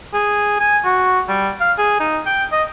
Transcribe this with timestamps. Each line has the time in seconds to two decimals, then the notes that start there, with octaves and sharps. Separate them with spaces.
0.14 G#4
0.60 G#5
0.85 F#4
1.29 G3
1.60 F5
1.78 G#4
2.00 D#4
2.26 G5
2.52 D#5